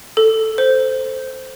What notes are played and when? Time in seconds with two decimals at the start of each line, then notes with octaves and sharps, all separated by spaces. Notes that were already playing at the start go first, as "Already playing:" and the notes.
0.17 A4
0.58 C5